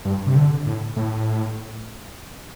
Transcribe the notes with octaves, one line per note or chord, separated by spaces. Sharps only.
G2
C3
D3
A2
A2